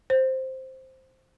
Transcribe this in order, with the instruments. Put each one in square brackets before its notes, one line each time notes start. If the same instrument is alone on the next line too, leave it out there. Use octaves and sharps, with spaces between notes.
[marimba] C5